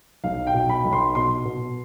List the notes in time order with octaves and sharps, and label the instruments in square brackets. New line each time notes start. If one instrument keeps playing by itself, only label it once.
[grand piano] B1 F5
G5
B2
B5
B1
C6
B2 C6
B2